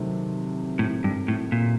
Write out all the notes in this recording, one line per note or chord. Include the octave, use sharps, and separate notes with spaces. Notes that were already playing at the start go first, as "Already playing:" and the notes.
Already playing: C3 D#3 F#3 A3
A2
G2
A2
A#2